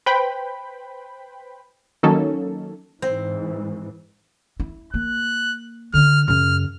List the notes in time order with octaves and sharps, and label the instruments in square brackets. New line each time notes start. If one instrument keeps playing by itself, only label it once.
[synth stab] B4 C5 G5 B5
D#3 F#3 A#3 C#4 D#4 A4
[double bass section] G#2 E3 [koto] C4
[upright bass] E4
[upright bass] A#3 [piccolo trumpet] F#6
[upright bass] D3 D4 [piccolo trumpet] F6
[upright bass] F#2 C#3 [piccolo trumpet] F6